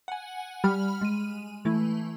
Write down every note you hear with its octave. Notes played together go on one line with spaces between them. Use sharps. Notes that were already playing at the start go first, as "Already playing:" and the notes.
F#5 G#5
G3 B5 F6
G#3 D#7
E3 A3 E4